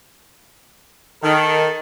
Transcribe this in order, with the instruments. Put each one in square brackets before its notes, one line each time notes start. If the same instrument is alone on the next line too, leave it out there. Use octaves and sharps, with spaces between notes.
[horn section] D#3 [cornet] A4